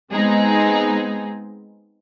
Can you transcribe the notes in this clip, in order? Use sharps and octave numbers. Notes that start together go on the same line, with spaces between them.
G#3 B3 C4 D#4 G#4